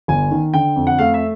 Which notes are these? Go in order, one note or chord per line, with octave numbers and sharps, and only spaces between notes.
G1 G#5
D#3
D3 G5
F2
F#5
A3 F5
E5